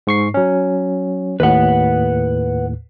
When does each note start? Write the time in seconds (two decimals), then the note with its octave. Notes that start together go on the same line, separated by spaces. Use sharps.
0.07 G#2 C#6 C7
0.34 F#3 C#4
1.40 D#2 A2 B4 F#5